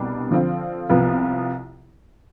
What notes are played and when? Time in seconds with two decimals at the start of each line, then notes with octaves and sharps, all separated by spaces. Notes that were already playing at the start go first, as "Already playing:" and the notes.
Already playing: C2 B2 G3 B3 D4
0.31 D3 F3 C4 F4
0.89 C2 C3 F3 B3 F4